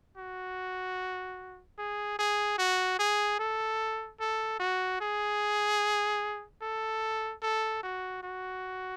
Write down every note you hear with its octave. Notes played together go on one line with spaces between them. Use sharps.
F#4
G#4
G#4
F#4
G#4
A4
A4
F#4
G#4
A4
A4
F#4
F#4